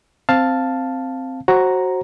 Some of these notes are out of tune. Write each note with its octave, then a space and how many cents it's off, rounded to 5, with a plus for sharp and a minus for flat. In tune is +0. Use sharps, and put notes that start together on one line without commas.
C4 +0 F5 +0 A5 +0
F#4 +5 C5 +30 A#5 +0